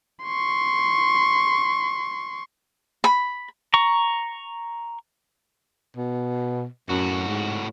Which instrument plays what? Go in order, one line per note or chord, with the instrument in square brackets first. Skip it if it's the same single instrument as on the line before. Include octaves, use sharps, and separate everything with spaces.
[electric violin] C6 C#6
[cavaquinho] B5
[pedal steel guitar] A#5 C#6
[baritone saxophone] B2
[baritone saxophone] F#2 [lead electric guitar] A2 F#4
[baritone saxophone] G#2